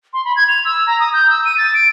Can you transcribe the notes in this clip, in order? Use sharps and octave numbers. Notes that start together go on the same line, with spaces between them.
C6
B5
G#6
F7
E6
A#5
D#6
G6
E6
D#7
A6
D7